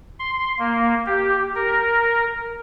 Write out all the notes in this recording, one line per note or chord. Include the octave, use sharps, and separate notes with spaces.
C6
A#3
G4
A#4